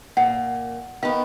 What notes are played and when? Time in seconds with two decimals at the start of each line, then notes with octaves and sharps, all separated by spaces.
0.17 A#2 F#5
1.03 D#3 B3 F5